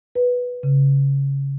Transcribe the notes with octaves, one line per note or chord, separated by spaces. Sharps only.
B4
C#3